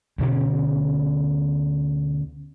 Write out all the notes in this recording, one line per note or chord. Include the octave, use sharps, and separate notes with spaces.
D2 B2 D3 C#4